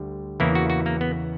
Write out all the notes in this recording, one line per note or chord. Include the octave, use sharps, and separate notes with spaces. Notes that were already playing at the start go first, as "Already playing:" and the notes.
Already playing: D2 D3 G3
E2 C#3 E3 A#3 E4
F#4
F#4
A#3
B3